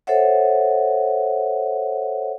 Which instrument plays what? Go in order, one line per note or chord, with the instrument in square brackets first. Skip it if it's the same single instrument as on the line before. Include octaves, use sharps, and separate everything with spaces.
[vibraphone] A4 C5 C#5 E5 F#5